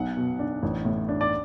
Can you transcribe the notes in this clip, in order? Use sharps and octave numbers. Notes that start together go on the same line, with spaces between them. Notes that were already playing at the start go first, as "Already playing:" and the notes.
Already playing: B1 F#5
B2
D4
A1
A2
D4
D5